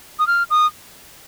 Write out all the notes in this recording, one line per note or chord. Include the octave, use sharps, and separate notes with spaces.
D#6
F6
D#6